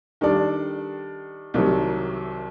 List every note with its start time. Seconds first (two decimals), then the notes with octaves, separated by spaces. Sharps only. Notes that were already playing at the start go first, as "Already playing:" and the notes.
0.21 D#3 G3 D4 A4 D5
1.54 C2 C3 D#3 F#3